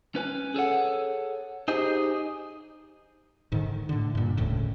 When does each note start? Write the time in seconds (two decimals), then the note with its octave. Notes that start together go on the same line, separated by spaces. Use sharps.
0.15 C#4 B4 G#5
0.54 G#4 A4 C#5 F#5
1.68 D#4 G4 G#4 C5 D#5
3.52 G#2 D3 D#3
3.89 A2 D3
4.15 G2 A#2
4.37 E1 D2 A2 C#3